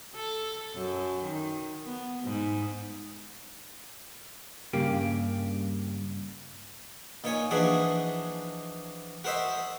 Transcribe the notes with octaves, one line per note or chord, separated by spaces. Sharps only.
A4
F#2
D#3
B3
G#2
G2 C#3 A#3 G4
A#2 D#4 C#5 G#5
E3 F3 D4 D#4 F#4 G#4
F#4 A#4 C5 D#5 E5